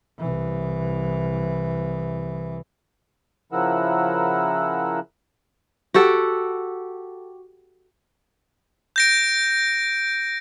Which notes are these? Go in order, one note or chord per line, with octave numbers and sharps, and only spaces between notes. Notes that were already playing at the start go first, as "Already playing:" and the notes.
C2 E3
C#3 F3 E4 A#4 F#5 E6
F#4 G4 A4
G6 A#6 D7